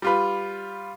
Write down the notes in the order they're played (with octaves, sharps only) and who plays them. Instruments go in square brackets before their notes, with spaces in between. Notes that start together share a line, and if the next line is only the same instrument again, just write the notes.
[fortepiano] G3 F4 B4